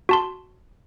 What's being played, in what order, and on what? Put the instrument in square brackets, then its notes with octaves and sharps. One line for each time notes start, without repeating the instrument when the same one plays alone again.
[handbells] F#4 A5 C6